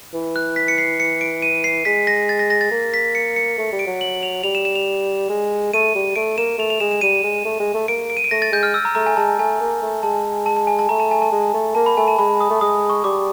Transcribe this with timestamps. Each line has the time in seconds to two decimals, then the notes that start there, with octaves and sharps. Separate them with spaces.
0.14 E3
0.36 F#6
0.56 B6
0.68 C#7
0.78 C7
1.00 C#7
1.21 D7
1.42 D#7
1.64 C7
1.85 G#3 B6
2.07 A#6
2.29 A6
2.39 A#6
2.50 A#6
2.61 A6
2.71 A#3
2.94 B6
3.15 C#7
3.36 C#7
3.58 A3
3.72 G3
3.79 D7
3.87 F#3
4.01 F#7
4.23 F7
4.43 G3 F7
4.55 E7
4.65 E7
4.75 F7
5.29 G#3
5.74 A3 D#7
5.95 G3
6.16 A3 D7
6.37 A#3 E7
6.58 A3 F7
6.70 F7
6.80 G#3 E7
6.91 E7
7.01 G3 D#7
7.24 G#3
7.45 A3
7.60 G#3
7.74 A3
7.88 A#3 D7
8.10 D7
8.17 D#7
8.24 D7
8.31 A3 A#6
8.42 A6
8.52 G#3 G6
8.63 F6
8.74 E6
8.85 A#5
8.95 A3 A#5
9.06 G#5
9.17 G#3 A5
9.39 A3 G#5
9.60 A#3
9.82 A3
10.03 G#3 A5
10.46 A5
10.57 A5
10.67 G#5
10.79 A5
10.89 A3 A#5
11.00 A5
11.11 G#5
11.22 A5
11.32 G#3
11.54 A3
11.75 A#3 A5
11.86 B5
11.97 A3 G#5
12.08 A5
12.19 G#3 B5
12.40 D#6
12.50 A3
12.61 G#3 D#6
12.90 C#6
13.04 G3 D6